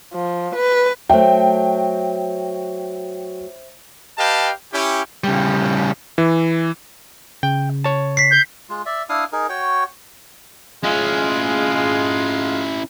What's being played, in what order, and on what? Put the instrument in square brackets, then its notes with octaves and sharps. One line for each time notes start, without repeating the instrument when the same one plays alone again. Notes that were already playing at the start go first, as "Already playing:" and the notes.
[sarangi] F3
B4
[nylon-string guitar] F#3 A3 [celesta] C5 E5 [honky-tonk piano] G5
[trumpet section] G4 B4 D#5 F5 G5 A5
C#4 E4 G4
[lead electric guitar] C#3 G3
[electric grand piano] E3
[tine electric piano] C#3 [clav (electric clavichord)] G5
[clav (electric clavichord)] C#5 A5
[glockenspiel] B6 C7
[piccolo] G6
[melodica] G#3 F4
D5 E5
D4 E4 F5 D#6
D#4 G#4 A#4
F#4 C#5 G5
[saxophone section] G#3 F4 [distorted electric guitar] C#4 E4